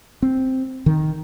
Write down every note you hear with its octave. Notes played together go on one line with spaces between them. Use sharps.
C4
D#3